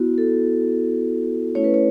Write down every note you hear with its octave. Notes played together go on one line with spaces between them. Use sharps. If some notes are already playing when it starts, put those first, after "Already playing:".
Already playing: B3 E4 F#4
A4
A3 C#4 E4 C#5
B4
C#5